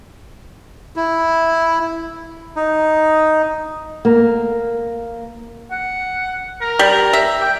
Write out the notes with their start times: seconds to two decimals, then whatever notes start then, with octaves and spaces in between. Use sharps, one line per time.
0.96 E4
2.56 D#4
4.05 A#3
5.71 F#5
6.61 A#4
6.79 G3
7.13 E5
7.41 G5